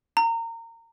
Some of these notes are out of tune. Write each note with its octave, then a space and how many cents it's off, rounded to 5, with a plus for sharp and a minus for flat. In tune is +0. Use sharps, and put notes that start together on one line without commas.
A#5 -25